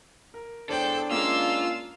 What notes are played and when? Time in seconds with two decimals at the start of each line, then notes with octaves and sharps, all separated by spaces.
0.34 A#4
0.69 E1 D4 A4 C5 G5 F#7
1.11 G#3 A#3 C#4 F4 F5 E6